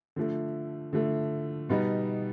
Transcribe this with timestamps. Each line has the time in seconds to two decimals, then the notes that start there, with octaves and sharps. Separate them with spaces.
0.16 D3 F3 A3
0.93 D3 F3 A3
1.69 B2 G3 B3 D#4